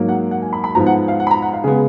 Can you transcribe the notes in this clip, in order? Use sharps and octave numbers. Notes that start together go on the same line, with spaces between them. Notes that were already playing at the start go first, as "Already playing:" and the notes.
Already playing: G#2 F#3 A#3
F#5
F#5
G#5
B5
B5
G#2 F3 B3 A#5
F#5
F5
F#5
B5
A#5
F#5
F5
C#3 G#3 B3 G#4